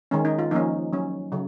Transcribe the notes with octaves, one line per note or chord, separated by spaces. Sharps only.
D#3 G#3 C#4
D#4
F4
F3 A#3 C#4 D#4
F#3 C#4
C#3 F#3